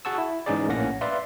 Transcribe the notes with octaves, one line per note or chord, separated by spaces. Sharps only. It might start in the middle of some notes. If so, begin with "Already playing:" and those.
F#4 G#4 F#5 A5 C#6 E6
E4
G#2 E3 C#4 D#4 G#4 D5
A#1 A2 A#3 C#4 F#5 A#6
B4 D5 E5 F5 C6